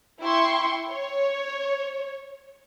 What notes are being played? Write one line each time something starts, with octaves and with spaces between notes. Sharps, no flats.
E4 G5 C6 C#6
C#5